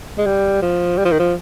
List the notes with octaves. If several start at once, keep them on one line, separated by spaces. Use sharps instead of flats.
G#3
G3
F3
G3
F3
D#3
F3